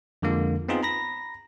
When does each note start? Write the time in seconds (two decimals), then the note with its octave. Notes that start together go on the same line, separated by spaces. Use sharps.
0.22 F2 D3 G#3 A#3 F4
0.69 B3 C4 D#4 F4 G#4
0.83 A#5 B5 A#6